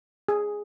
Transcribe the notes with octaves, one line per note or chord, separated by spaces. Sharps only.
G#4